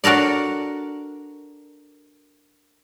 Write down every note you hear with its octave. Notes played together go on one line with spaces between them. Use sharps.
D4 F#4 A4 A#4 D5